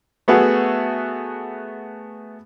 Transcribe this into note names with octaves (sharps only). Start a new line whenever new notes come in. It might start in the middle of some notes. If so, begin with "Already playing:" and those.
A3 B3 F#4 G#4